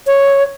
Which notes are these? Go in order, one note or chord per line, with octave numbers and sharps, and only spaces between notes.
C#5